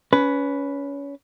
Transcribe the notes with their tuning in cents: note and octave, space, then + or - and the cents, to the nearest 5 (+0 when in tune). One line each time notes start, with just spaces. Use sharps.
C#4 +25 B4 +0